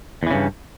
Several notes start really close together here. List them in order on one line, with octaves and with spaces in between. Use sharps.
E2 E3 C#3 G2